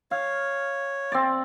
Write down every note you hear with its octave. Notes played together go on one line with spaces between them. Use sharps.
C#5 F5
C4 D5